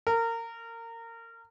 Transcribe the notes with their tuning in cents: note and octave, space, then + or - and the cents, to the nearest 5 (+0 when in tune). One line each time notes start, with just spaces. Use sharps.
A#4 -25